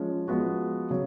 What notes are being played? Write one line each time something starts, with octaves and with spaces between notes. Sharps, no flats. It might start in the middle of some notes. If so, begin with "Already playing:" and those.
Already playing: F3 G#3 C#4
F3 G#3 B3 F#4
C#3 F#3